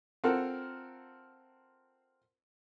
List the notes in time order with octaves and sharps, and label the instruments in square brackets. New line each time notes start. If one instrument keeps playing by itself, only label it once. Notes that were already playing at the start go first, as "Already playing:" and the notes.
[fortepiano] C4 F4 A4 A#4 F#5